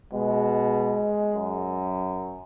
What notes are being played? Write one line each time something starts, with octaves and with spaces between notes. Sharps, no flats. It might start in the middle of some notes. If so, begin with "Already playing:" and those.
B2 G#3
F#2